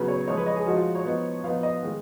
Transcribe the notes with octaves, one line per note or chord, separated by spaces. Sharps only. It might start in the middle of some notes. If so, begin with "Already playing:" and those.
Already playing: C#3 F#3 B3 B4
C#5
F3 G#3 D#4 C#5
B4
D#5
G#4
F3 G#3 D#4 F#4
F4
C#5
F3 B3 D#4
F3 B3 D#4 F5
D#5
D#3 G#3